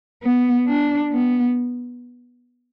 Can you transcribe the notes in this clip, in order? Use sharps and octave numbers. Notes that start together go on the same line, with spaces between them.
B3
D4
B3